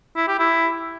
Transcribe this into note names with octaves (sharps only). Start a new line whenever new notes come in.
E4
G4
E4